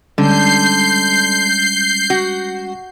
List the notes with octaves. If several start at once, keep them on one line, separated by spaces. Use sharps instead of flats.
D3 G3 G#3 C#4 G6 C7
F#4